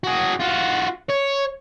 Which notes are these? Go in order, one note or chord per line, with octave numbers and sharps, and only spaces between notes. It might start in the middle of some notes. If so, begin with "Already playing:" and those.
F#4 G#4
F4 F#4
C#5